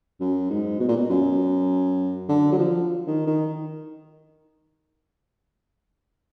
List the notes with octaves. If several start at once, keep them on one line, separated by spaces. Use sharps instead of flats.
F#2
G#2
B2
A#2
B2
F#2
D3
F#3
F3
D#3
D#3